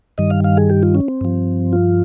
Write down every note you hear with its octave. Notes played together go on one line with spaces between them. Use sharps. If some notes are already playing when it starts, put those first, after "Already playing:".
G2 D#3 G3 D#5
F5
F5
G#4
G4
F4
C#4
C4
G2 F3
F4